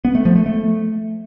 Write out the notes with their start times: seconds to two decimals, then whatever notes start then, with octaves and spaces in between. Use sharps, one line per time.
0.05 B3
0.15 A3
0.25 F3
0.36 A3
0.46 A3